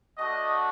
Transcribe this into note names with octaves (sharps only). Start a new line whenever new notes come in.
A3 D4 F#4 D#5